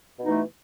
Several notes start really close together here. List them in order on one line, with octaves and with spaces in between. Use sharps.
B2 D#4 E3 A3